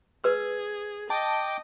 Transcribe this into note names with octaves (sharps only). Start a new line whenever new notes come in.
G#4 B4 E6
D#5 G5 A5 D6